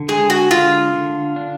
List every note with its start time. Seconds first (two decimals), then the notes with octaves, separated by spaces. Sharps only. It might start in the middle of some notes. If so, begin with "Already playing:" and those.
Already playing: D3
0.08 G#3 G#4
0.30 F#4
0.51 D3 F4
0.94 D3
1.36 D4